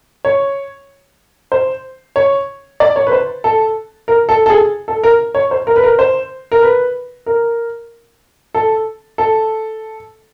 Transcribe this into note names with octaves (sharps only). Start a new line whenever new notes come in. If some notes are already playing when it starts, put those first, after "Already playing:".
C#5
C5
C#5
D5
C#5
B4
C5
A4
A#4
A4
A4
G#4
A4
A#4
C#5
C5
A#4
B4
A#4
C5
A#4
B4
A#4
A4
A4